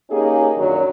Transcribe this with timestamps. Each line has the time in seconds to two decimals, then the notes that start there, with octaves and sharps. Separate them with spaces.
0.10 A#3 C#4 D#4 G4 G#4
0.57 F#2 A#2 D3 D#3 F#3